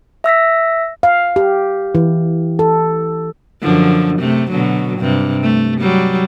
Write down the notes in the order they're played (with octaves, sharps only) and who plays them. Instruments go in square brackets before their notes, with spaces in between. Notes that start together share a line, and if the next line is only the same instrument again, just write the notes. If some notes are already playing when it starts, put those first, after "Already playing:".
[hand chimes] E5 E6 A#6 B6
[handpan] F5
G4
E3
A4
[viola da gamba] F#2 D3 F3
C3 A3
B2 D3 F#3
G2 C3
A3
F#3 G3